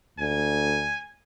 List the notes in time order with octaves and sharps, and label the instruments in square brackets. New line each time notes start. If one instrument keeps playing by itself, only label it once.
[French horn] D2 [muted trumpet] G#5